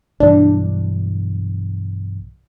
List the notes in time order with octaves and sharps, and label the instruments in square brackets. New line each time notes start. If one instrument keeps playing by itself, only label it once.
[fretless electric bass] B1 G2 E3 [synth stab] D4